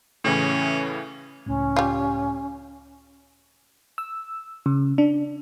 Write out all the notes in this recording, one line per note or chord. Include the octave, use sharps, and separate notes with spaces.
A2 C#3 E3 C#4
C#2 A2 C#4
G3 F4
E6
C#3
D4